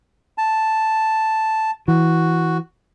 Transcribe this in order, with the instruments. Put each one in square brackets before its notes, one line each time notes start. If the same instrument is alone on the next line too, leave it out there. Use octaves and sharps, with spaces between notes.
[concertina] A5
[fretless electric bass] E3 [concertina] F#4